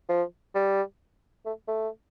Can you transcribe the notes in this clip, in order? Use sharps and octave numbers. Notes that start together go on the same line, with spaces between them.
F3
G3
A3
A3